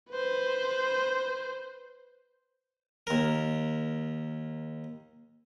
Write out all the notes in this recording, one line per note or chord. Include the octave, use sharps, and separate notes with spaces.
B4 C5
D#2 A#4